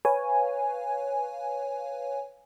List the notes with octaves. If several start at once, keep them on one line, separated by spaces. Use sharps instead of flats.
B4 C#5 F5 G#5